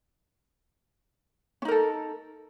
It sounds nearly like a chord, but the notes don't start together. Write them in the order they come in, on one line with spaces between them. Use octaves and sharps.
C#4 D#4 A#4 A4